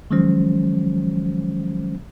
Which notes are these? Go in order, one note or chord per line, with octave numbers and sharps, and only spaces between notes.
D#3 F3 F#3 G#3 C#4 C5